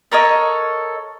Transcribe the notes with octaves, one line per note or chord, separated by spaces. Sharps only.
A4 A#4 C#5 D#5